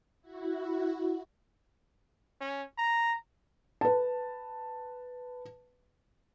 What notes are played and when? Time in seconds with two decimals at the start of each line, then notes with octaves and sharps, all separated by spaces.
0.21 E4 F#4
2.41 C#4
2.78 A#5
3.81 B4 A5